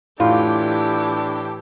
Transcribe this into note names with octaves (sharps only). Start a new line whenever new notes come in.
A2 E3 D4 F4 G4